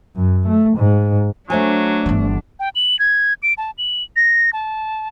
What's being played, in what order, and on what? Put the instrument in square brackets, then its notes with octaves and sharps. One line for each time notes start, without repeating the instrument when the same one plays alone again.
[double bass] F#2
A3
G#2
[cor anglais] F#3 [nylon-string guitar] A3 C5 G#5 [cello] D4
[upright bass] G1 E3
[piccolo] G5
F#7
G#6
D7
A5
F#7
A#6
A5